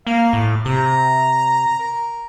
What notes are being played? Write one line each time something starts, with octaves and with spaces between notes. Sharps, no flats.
A#3 F5
A2
C3 A#5
A#4